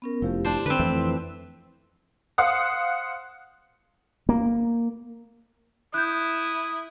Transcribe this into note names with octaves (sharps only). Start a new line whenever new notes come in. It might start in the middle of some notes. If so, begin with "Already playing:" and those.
B3 C#4 A#4
F1 F3 E4 G4
D4 C5
D3 C4 B4
F2 E3 A3 E4
C5 F5 F#5 D#6
A#3
E4 D#6 F#6 G6